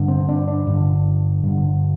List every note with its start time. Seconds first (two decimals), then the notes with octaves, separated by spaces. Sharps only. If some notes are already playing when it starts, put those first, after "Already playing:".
Already playing: G2 D3
0.08 C4
0.29 D4
0.48 D4
0.67 G2 D3
1.43 G2 D3